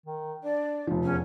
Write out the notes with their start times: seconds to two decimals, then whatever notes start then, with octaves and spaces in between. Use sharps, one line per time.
0.06 D#3
0.44 D4 D5
0.87 F1 F3
1.03 E2 C#4